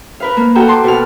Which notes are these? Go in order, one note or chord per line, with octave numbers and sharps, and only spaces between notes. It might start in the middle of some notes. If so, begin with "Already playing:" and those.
A#4 B4 F5
A#3
F#4 A4 G5 A#5
A5 C6 D6
B2 F#4 F6